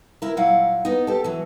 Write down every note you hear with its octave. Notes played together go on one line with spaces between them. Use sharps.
E4 A#4
A#2 F#3 E4 F5 F#5
B3 D#4
G4 A4
E3 F#3